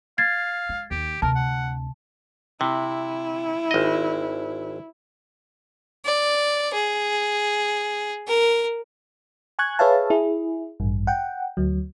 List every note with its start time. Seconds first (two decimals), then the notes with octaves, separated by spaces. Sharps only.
0.18 F5 G#6 A6 C7
0.69 G#3
0.91 D#2 G4
1.22 D2 C3 A#4 A5
1.35 F#5
2.61 C3 E4
3.71 G#1 D#5
6.05 D5
6.74 G#4
8.27 A#4
9.59 G#5 C#6 F#6 G#6
9.79 G#4 B4 C#5 E5 F5 A5
10.10 E4 G#4
10.80 A1 G2
11.07 F#5 G5
11.57 D2 F#3